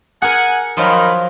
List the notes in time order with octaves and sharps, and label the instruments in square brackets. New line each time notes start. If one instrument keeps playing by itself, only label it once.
[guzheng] G#4 A#4 [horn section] F#5 G#5
[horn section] D#3 A#4 B5 [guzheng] F3 F#3 F4